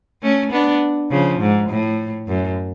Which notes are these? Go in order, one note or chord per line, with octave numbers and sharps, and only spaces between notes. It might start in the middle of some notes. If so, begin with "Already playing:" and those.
A3 C#4
B3 D4
C#3 F3
G#2
A2
F#2